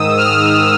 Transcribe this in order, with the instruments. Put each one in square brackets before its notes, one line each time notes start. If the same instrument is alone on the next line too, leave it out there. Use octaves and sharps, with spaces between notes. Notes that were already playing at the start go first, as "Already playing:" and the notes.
Already playing: [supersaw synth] G#2 D#3 D#6 E6
F6